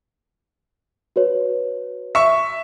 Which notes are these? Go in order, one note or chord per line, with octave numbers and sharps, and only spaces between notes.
F#4 B4 C#5
E5 C#6